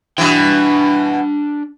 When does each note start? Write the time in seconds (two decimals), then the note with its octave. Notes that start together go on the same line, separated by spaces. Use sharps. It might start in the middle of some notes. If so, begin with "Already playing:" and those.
0.18 B2 E3 D4 G5